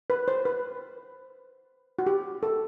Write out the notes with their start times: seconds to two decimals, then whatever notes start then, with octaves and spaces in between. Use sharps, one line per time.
0.10 B4
0.28 C5
0.45 B4
1.99 F#4
2.06 G4
2.43 A4